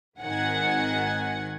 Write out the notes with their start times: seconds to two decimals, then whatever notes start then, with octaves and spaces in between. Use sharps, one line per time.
0.19 G#1 D#3 F#5 G#5